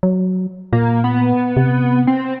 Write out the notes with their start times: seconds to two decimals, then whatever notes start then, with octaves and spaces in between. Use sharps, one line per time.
0.03 F#3
0.73 A#2 A#3
1.04 B3
1.57 C3
2.07 C4